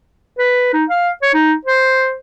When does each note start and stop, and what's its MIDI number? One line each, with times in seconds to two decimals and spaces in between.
0.38 0.71 71
0.73 0.84 63
0.89 1.09 77
1.22 1.29 73
1.34 1.53 63
1.65 2.15 72